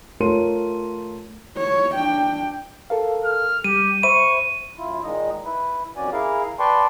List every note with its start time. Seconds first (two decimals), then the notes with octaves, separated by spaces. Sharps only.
0.20 A3 F4 A#4 C#5 C6 D#7
1.58 C#5
1.93 D4 G5
2.90 A4 A#4 F5
3.25 F6
3.64 G3 G4 D#7
4.03 C5 E5 B5 C#6 D#7
4.78 F#2 E4 F4
5.04 A#2 D#3 G#3 D#4 D#5
5.45 E4 B4
5.96 F2 D#3 C#4 F#4 D5 G#5
6.12 E4 G#4 A#4 F5
6.59 B4 D5 G5 A5 C6 C#6